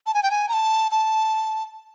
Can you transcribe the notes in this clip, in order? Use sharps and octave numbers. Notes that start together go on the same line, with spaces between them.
A5
G#5
G5
G#5
A#5
A5
A5